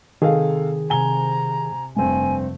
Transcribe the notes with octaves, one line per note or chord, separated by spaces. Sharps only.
C3 D#3 G#4 A4 F5
C3 G#5 A#5 G7
F1 G2 A3 C4 G#5